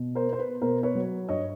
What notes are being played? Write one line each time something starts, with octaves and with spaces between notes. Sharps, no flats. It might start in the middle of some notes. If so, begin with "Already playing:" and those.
Already playing: B2
A#4 C5
B3 C5
B4
B2 A#4 C5
B4 C#5
F#3
G2 C#5 D#5